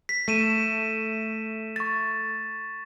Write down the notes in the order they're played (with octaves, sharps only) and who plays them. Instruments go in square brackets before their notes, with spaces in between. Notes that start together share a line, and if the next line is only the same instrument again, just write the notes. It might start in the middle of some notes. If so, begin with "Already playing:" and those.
[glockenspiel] B6
[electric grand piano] A3 [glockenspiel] B6 D#7 E7
[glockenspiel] C#6 A6